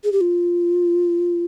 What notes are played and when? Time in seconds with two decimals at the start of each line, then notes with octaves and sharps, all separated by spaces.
0.04 G#4
0.12 G4
0.21 F4